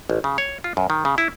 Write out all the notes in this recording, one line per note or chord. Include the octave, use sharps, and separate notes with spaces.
A1
C#3
C#5
F4
F#2
D#3
C#3
E4